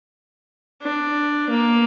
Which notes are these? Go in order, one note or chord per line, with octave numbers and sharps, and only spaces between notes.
D4
A#3